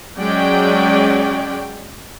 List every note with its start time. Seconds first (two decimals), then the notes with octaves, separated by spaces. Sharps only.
0.17 F#3 G#3 C#4 D5 G5